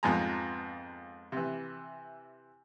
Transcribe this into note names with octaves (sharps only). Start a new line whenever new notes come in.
F2 G#2 F3 B3 G#5 A#5
C3 E3